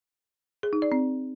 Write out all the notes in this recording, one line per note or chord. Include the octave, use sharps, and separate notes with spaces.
G#4
D#4
D5
C4